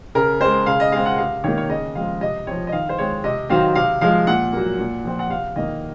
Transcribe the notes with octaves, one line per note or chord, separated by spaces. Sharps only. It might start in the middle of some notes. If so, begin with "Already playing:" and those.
C#3 A#4
G#3 C4 C5
C#3 F5
D#5
G#3 C4 F5
F#5
C3 F5
D#3 A#3 C#5
C#5
C#3 D#5
F3 G#3 C4 F5
C3 D#5
F3 C4 C#5
D#5
D#3 F5
C5
G#3 C4 C#5
C3 D#5
D#3 F#3 C4 F5
C3 F5
F3 G#3 F5
A#2 F#5
F#3 A#3
A#2
F3 C4
F#5
C3 F5
D#3 A#3 D#5